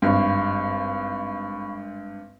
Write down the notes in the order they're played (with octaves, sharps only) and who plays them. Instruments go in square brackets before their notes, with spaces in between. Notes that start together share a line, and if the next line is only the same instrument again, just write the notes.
[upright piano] G#1 G2 [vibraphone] F5 B5 C#6